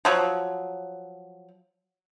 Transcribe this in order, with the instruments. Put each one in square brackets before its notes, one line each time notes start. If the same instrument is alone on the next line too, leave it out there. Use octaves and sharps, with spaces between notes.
[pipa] F3 F#3